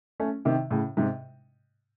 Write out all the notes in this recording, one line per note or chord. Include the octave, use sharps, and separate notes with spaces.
A3 C#4
C3 D#3
A2 C#3
G#2 C3